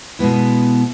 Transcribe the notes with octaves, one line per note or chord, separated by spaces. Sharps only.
B2 G#3 B3 E4